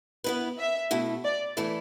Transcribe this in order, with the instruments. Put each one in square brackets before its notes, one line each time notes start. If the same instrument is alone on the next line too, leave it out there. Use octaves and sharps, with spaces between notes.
[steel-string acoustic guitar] B3 E4 B4
[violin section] E5
[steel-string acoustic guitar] B2 A3 E4
[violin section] D5
[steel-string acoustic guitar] E3 A3 E4 A4 D5